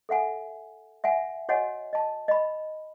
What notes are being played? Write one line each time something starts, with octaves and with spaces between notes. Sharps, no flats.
A4 E5 F#5 G#5
E5 F#5 G#5
F#4 C#5 D#5 F#5 G#5
D#5 A5
D#5 B5